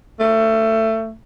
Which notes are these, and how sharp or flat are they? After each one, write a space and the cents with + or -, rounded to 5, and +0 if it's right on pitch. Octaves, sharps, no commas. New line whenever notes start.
A3 +20